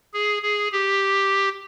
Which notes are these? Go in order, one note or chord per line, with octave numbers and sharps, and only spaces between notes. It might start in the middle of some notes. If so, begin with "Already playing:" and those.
G#4
G#4
G4